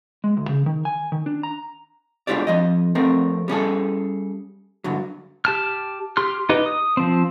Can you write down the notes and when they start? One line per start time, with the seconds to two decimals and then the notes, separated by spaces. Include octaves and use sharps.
0.24 G#3
0.37 D2
0.49 C#3
0.66 D#3
0.85 G#5
1.12 D#3
1.26 D4
1.43 A#5
2.27 G#3 D4 F4 G4 C#5 D5
2.47 F2 F3 D#5
2.95 F2 A3 C4 A#4
3.48 G3 C#4 G#4 A4
4.84 G2 D3 F#3
5.45 G4 A5 F6
6.17 G4 C6 F6
6.49 D#4 G4 B4 D#5
6.66 D#6
6.97 F3 C4